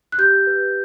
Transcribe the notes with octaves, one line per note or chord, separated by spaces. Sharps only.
F#6
G4 G6
B4